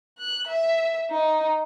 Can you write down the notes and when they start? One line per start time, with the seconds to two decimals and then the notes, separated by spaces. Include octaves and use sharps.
0.18 F#6
0.48 E5
1.11 D#4